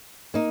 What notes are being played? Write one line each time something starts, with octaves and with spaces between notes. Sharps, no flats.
A#3 D#4